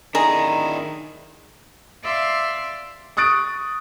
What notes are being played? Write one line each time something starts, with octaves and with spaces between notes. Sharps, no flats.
D#3 D4 E4 G#4 A#5
D5 E5 F5 C6
C#6 D#6 F#6 A6 D7